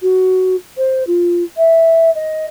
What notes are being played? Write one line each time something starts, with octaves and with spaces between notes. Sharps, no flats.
F#4
C5
F4
E5
D#5